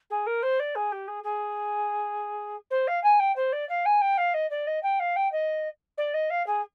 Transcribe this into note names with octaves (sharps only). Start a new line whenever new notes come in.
G#4
A#4
C5
D5
G#4
G4
G#4
G#4
C5
F5
G#5
G5
C5
D5
F5
G#5
G5
F5
D#5
D5
D#5
G5
F5
G5
D#5
D5
D#5
F5
G#4